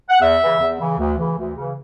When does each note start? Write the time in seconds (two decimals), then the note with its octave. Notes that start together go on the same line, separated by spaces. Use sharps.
0.09 F#5
0.20 E2 E5
0.40 C#3 E3
0.59 E2
0.79 C#3 E3
0.98 D2
1.18 C#3 E3
1.36 D2
1.56 C#3 E3